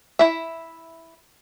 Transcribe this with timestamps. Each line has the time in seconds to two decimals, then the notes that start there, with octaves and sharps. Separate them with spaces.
0.19 E4 E5